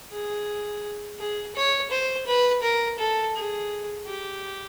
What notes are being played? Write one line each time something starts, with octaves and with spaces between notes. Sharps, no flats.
G#4
G#4
C#5
C5
B4
A#4
A4
G#4
G4